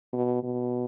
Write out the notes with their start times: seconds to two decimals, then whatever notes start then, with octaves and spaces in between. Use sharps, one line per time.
0.13 B2
0.43 B2